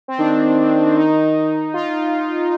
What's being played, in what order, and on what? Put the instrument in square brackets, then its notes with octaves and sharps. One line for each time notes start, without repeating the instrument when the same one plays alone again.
[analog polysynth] C4
[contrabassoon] D#3 [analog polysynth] D4
[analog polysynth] D#4
F4